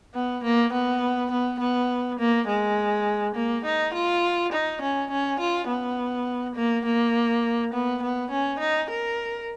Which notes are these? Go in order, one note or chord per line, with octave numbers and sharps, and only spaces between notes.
B3
A#3
B3
B3
B3
A#3
G#3
A#3
D#4
F4
D#4
C#4
C#4
F4
B3
A#3
A#3
B3
B3
C#4
D#4
A#4